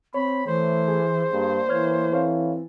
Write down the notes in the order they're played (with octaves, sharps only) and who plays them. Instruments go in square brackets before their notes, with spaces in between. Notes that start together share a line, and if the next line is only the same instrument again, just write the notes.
[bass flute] C4 [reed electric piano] C#5 [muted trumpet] B5
[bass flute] E3 [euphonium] A3 [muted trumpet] C5
[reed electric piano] G#4
[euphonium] G2 [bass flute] A#3
[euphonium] E3 [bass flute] A#3 [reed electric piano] C#5 F6 G#6
[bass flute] C4 [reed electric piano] A4 C#5 F5